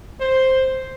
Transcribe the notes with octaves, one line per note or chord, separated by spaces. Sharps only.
C5